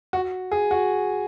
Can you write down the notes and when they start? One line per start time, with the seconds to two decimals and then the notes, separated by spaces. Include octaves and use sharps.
0.13 F#4
0.51 G#4
0.71 F#4